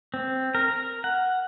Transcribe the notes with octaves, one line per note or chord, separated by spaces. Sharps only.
C4
A#4
A#4
F#5